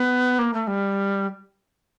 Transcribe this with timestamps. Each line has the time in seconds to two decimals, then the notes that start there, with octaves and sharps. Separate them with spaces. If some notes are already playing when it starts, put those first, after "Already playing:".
Already playing: B3
0.39 A#3
0.54 A3
0.67 G3